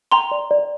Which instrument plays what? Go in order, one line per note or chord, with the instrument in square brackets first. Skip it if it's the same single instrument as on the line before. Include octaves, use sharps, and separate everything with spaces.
[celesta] G5 [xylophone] A#5 C6
[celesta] D5
D5